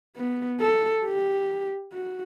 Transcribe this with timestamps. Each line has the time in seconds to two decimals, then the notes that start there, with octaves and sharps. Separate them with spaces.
0.17 B3
0.61 A4
1.05 G4
1.93 F#4